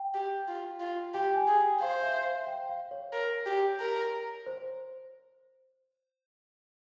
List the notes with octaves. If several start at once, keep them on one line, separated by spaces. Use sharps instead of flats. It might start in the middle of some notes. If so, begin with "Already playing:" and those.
Already playing: G5
G4
F4
F4
G4 G5
G#5
G#4
G5
C5 F5
E5
F5
G5
F5
C#5
A#4
G4
A#4
C5